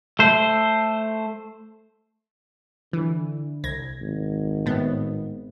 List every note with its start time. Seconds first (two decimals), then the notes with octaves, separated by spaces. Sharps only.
0.19 A3 C5
2.93 D3 E3
3.64 C2 G#6 A#6
4.01 G#1
4.66 A2 B3